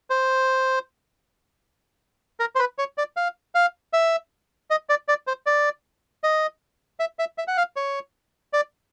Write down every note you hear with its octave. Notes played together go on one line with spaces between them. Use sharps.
C5
A#4
C5
B4
C#5
D5
F5
F5
E5
D#5
D5
D5
C5
D5
D#5
E5
E5
E5
F#5
F5
C#5
D5